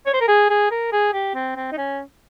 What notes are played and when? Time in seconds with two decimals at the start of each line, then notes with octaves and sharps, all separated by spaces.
0.06 C#5
0.14 C5
0.21 A#4
0.28 G#4
0.50 G#4
0.71 A#4
0.92 G#4
1.13 G4
1.35 C4
1.56 C4
1.72 D#4
1.78 C#4